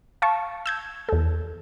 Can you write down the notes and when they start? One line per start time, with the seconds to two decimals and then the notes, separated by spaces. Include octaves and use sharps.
0.22 F5 A5 C#6
0.66 E6 G6 G#6
1.09 E2 A4